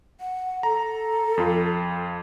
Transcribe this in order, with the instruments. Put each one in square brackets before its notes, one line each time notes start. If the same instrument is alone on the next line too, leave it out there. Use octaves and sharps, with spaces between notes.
[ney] F#5
[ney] A4 [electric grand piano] A#5
[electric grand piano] F2 F4